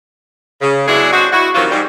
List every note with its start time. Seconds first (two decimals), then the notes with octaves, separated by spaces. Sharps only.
0.61 C#3
0.88 F#3 G#3 B3 D4 E4 G#4
1.13 G#3 C4 D4 F#4
1.33 E4 F#4
1.55 C3 D#3 E3 F#3 F4 F#4
1.71 G#2 G3